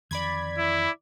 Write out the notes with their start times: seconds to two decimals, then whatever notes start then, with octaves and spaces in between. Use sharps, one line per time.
0.11 F2 D#3 E3 D5 B5 G#6
0.58 E4